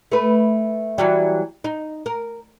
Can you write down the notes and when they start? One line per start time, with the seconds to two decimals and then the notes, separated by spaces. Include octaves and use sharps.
0.12 A3 B4
0.98 E3 F#3 G3
1.64 D#4
2.06 A#4